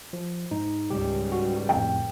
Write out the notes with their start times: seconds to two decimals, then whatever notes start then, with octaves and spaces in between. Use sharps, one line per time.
0.13 F3
0.51 G#2 D#4
0.90 C#2 G#2 G3 G4
1.32 F#4
1.69 F2 A2 G5